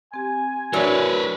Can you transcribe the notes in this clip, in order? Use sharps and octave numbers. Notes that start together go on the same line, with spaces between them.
C4 G4 G#5
A2 F#3 D4 A#4 B4 C#5 D5